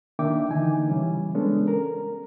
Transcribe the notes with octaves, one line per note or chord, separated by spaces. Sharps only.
D#3 A#3 D4 E5 G5 D6
D3 E3 D#4 G#5
C#3 E3 G3 C#4
G#3 B3 C#4 D4 A4
A#4